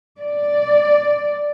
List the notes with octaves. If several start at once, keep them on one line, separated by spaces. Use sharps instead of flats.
D5